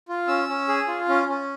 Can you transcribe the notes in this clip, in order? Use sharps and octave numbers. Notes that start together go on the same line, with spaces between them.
F4
C#4 E6
C#4
G#4
F4
C#4
C#4